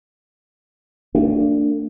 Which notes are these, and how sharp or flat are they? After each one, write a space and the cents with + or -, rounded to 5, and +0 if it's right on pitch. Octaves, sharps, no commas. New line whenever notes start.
A3 +45 D4 -5